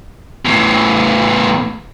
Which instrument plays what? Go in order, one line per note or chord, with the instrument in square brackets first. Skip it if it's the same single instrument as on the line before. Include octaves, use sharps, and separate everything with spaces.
[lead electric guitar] E2 A2